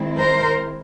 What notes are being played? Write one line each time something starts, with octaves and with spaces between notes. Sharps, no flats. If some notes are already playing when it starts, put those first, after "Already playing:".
Already playing: D#3 G#3 C4 E4
A#4 C5